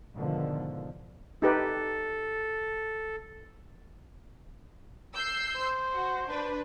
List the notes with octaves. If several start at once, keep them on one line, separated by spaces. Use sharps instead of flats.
G#2 B2 D3 D#3 F3
D#4 G4 A4 B4
E6 G6 C7
C5
F#4
D4 B4